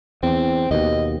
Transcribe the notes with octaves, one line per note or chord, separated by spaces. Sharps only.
E2 C4
D#2 B2 D#5